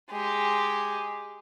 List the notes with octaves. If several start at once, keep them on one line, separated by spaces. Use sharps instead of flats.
G#3 G4